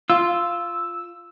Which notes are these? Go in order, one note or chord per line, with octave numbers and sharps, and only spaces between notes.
F4 E6